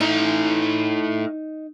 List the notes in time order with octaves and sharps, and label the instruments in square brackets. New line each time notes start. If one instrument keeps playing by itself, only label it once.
[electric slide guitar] A3 E4 A#5 [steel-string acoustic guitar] D#4